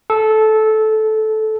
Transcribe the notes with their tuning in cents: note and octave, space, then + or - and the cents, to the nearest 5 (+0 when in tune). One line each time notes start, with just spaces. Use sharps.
A4 -15